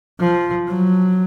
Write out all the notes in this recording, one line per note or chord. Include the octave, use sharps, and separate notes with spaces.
F3
F#3